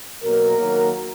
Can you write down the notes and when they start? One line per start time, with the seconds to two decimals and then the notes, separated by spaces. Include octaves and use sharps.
0.23 B2 F#3 A#3 A#4
0.57 D#3 F#3 A#3